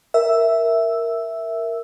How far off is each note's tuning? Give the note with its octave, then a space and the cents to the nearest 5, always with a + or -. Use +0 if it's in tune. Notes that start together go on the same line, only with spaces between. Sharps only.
A#4 +0 E5 +0 E6 +0